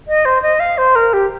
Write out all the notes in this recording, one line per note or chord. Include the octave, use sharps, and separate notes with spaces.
D#5
C5
D#5
F5
C5
A#4
G4